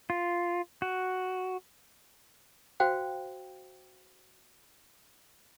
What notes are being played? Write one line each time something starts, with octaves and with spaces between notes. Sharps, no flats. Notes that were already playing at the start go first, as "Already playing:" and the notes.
F4
F#4
F#4 C5 F5 G5